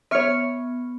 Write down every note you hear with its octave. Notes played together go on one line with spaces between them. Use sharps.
B3 C#5 E5 C#6 F6 C#7